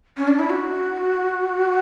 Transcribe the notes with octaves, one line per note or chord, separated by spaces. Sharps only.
C#4
D4
E4
F#4